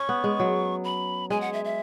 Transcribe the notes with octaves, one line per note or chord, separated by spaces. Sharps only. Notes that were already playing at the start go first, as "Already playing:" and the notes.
Already playing: C#4 C#6
B3
G#3
F#3
B5
G#3 G#5
F#5
E5
E5